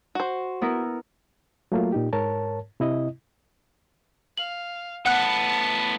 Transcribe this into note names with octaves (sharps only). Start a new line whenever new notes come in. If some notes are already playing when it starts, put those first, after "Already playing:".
F#4 C5
B3 E4 A#4
F#3 A3 A#3 F4
A#2 D#4 G4
G#2 A#4 C#5 A5
C3 E4 D#5
F5 F#7
A2 B3 F#5 A5 F#6